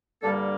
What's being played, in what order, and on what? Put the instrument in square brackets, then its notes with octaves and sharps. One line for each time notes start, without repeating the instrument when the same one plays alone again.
[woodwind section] G2 D3 G3 A#3 A4